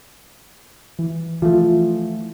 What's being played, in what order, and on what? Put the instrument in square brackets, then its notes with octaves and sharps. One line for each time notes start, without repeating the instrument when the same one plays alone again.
[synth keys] E3
[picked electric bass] E3 F3 A3 [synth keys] F4